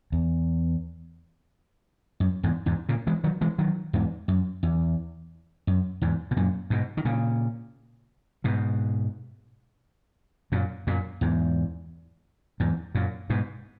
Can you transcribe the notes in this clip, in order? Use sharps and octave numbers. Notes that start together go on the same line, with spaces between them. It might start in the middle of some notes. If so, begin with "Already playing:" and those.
E2
F#2
E2 G#2
E2 G#2
A#2 C#3
E3 G#3
D#3 F#3
E3 G#3
D#3 F#3
E2 G#2
F#2
E2
F#2
E2 G#2
B2
F#2 A#2
G#2 B2
D#3
A#2 C#3
G#2 B2
F#2 A#2
F#2 A#2
E2 G#2
E2 G#2
F#2 A#2
G#2 B2